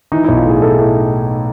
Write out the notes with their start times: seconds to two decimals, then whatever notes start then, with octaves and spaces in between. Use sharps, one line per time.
0.12 E3 D#4
0.24 B1 E4
0.37 F4
0.46 A2 G#4
0.62 B1 A4
0.70 G#4
0.78 A2 A4